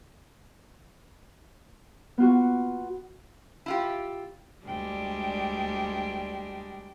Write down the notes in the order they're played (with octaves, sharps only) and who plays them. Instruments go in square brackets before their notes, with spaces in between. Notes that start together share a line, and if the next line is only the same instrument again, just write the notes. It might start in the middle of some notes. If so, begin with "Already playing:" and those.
[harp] B3 F4 F#4
[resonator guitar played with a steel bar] E4 F4 G4
[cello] D2 G5 [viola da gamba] G3 G#3 D4